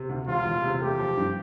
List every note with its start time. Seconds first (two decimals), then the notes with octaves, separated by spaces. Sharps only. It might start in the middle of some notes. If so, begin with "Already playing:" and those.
Already playing: C3
0.09 D2
0.28 E1 F4
0.46 E1
0.63 C3
0.81 A3 G4
0.99 F3
1.17 G2